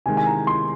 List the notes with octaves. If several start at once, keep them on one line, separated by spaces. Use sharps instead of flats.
C3 D#3 G#3 G#5
G#5
A#5
C6